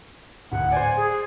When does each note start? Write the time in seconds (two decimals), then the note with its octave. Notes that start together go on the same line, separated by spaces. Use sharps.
0.52 D1 F#5
0.72 C5 D5 G#5
0.97 G#4